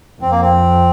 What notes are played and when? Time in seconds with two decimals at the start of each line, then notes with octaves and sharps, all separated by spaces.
0.22 F2 C4
0.31 A#3
0.41 C4